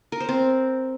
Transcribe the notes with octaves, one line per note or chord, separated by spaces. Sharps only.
A#4
C5
C4